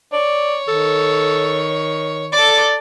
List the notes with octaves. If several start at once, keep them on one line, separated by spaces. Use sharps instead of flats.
C#5 D5
D#3 A4
A4 D5 D6